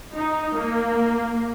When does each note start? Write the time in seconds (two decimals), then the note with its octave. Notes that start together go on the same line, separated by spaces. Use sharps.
0.14 D#4
0.56 A#3